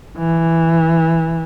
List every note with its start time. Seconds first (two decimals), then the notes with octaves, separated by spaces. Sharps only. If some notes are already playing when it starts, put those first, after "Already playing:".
0.17 E3